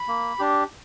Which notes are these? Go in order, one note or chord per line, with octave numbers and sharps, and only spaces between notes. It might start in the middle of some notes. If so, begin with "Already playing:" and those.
Already playing: B5
A#3
D4 G4